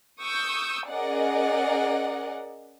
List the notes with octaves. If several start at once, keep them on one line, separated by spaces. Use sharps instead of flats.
C#6 D#6 E6 G6
C#4 G#4 A#4 D5 D#5 F#5